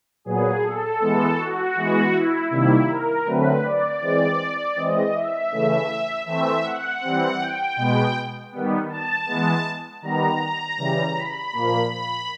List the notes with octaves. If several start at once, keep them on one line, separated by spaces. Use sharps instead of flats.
A#2 F#3 B3 G#4
A4
E3 G#3 B3
F#4
E3 G#3 B3
E4
C3 D#3 G3 A#3 E4
A#4
D3 F#3 A3 C4 B4
D5
E3 G#3 C4
E3 G#3 C4 D#5
E5
C#3 E3 A3
E3 A3 C4 E5
F#5
E3 G3 C4
G5
B2 G#3 B3
D#3 G3 B3
A5
E3 G#3 B3
D#3 G3 B3 A#5
C#3 E3 G3
B5
A#2 F3 A#3
B5